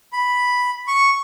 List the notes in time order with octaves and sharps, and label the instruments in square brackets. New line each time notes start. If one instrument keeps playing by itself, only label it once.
[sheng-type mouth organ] B5
C#6